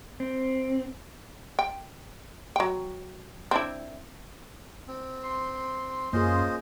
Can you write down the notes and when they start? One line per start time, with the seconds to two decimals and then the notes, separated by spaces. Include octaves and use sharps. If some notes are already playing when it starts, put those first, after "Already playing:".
0.20 C4
1.59 G5
2.56 F#3 G5
3.51 C4 D4 E4
4.88 C4
5.23 C6
6.13 F#2 A#3 C#4 F4 G#4 C5 D#5